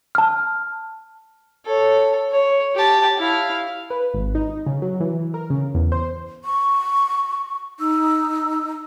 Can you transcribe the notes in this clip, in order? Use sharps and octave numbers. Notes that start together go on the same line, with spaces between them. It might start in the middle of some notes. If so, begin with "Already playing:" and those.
A5 F6
A4 C#5
C#5
G4 A5
E4 F5
B4
G#1
D#4
C#3
F#3
E3
A#4
C#3
E2
C5
C#6
D#4 E6